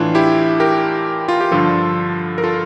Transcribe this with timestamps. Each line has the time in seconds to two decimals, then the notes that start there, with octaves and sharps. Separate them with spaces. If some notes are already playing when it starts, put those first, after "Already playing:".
Already playing: A2 E3 D4 F4
0.15 E4 G4
0.60 G4 A#4
1.28 F4
1.41 G4
1.51 G2 D3 F3 F4 A4
2.38 A#4
2.44 F4 A4